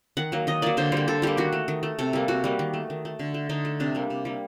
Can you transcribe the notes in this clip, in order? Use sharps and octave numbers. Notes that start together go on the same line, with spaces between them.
D#3 F#5
F#3 A#3
D#3 D#5
F#3 A#3 D5
D3 C5
G3 A#3 C5
D3 A4
G3 A#3 G4
D#3 F#4
A3
D#3
A3
C3 A4
G3 A#3
C3 F#4
G3 A#3
D#3
A3
D#3
A3
D3
A3
D3 D#4
A3
C3 D4
G3 A#3
C3
G3 A#3